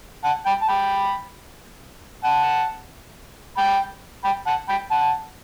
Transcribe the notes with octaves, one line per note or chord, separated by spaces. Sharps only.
F#5 A5
G5 B5
A5
G5 B5
F#5 A5
G5 B5
G5 B5
F#5 A5
G5 B5
F#5 A5